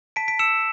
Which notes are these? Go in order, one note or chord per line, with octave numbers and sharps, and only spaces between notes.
A5 B6 D7
B6 D7
E6 C#7 E7